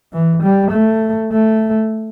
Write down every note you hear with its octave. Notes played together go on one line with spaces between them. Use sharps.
E3
G3
A3
A3